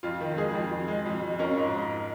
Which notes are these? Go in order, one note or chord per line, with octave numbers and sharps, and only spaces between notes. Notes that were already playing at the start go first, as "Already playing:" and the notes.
F2 F4
D#3
G#3 G#4
F2
F2
G#3
F2
F2
C#4 F4 A#4
G#2
G#2